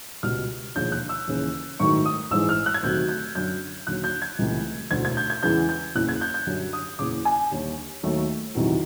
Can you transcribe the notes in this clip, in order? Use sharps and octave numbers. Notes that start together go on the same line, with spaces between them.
C#2 B2 G3 F6
E1 D#2 D3 F3 G#3 G6
F#6
E6
D#2 C#3 E3
A1 G#2 D#3 F#3 A3 C#6
D#6
A1 G#2 E3 G#3 E6
F6
F#6
G#6
D2 C3 D#3 F#3 A3 G6
G6
F#2 D3 F#3 G6
D#2 D3 F#3 F#6
G6
G#6
C#2 C3 E3 A3
E1 D2 D3 G#6
G#6
G6
G#6
E2 C#3 E3 G#3 G6
G6
F#1 E2 C#3 F#6
G#6
G6
G6
F#2 D3 G3
D#6
F#1 E2 C#3 D6
G#5
D#2 D3 G3
D#2 D#3 F#3 A3
E2 C3 D#3 F#3